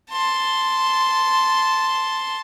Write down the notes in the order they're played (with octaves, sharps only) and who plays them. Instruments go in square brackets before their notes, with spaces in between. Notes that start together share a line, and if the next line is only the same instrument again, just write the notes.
[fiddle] A5 C6